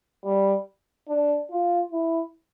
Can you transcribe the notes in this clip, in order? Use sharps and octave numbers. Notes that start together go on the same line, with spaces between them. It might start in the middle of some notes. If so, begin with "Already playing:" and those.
G3
D4
F4
E4